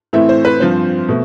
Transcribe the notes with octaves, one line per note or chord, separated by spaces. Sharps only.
A2 E3 A3 C4 E5
C5
B4
G2 F3 C4 C5
B2 A3